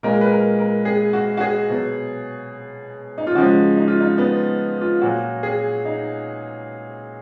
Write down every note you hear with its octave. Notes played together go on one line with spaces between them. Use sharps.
A#2 G#3 A#4
B4
A#4
A#4
G#4
F#4
F#4
G#4
B2 F#3
D#4
F4
C#3 F3 G#3 F#4
D#4
F4
D#4
B3
F4
A#2 F#3 F#4
G#4
D#4